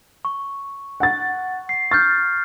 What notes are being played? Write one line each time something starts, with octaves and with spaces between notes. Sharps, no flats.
C#6
F#5 A6
C7
C#6 F6 G6 A6